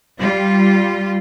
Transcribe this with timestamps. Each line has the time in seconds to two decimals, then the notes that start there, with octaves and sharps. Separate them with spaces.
0.19 G3 F4